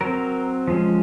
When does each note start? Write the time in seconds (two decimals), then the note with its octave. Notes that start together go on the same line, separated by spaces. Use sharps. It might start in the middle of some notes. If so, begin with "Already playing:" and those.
0.01 F#3 C4 A#4
0.68 F3 G#3 C#4